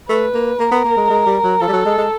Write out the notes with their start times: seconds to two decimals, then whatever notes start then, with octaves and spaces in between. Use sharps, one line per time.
0.08 A3 B4
0.34 A#3
0.59 A#3 A#4
0.72 B3
0.85 A#3
0.97 G#3
1.10 G#3
1.26 G3
1.44 F#3
1.60 F3 A4
1.68 G3
1.73 F#3
1.86 G#3
1.98 G#3